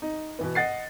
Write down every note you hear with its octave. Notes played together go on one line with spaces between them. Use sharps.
D#4
B2 E3 B3
D#5 F#5 A6 C7